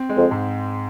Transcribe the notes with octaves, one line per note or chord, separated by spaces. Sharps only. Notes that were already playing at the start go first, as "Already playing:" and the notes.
Already playing: C4
G#3
F2
G#2